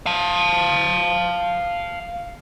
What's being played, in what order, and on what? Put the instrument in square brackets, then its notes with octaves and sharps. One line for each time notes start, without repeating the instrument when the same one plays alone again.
[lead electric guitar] F5 A5